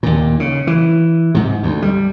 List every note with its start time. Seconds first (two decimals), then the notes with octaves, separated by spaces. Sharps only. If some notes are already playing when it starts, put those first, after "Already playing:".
0.03 D#2 A#2
0.40 C#3
0.67 E3
1.35 G#2 C3
1.63 D2
1.82 G3